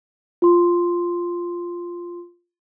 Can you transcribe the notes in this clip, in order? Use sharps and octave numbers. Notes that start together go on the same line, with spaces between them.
F4 C6